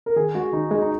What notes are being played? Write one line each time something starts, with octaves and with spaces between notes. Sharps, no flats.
A#4
D#3 G#4
G#3 F#4
D#3 D#4
G#3 D#4
D#4